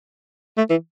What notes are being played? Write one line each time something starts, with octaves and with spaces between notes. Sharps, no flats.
A3
E3